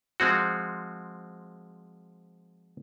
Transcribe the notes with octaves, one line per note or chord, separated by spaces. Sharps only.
F3 G#3 C4 F#4